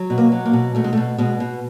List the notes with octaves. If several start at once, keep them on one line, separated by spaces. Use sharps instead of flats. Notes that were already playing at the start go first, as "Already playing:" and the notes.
Already playing: F#3
B2
A#3
F#3
A#3
B2
B2 A3
G#3
A3
B2
B2 G#3
B2